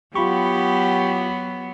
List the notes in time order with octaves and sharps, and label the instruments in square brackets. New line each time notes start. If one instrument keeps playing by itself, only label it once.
[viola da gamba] F#3 B3 [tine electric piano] F4 B5 C#6 [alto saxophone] G4